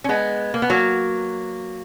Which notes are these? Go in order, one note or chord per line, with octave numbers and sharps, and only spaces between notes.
C#4
G#3 B3
A#3
B3
F#3 A#3